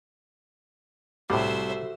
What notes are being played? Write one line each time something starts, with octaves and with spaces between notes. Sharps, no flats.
C2 A2 G3 F#4 G4 A4 C5 E5